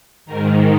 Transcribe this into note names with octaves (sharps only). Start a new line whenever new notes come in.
G#2 D#3 A#4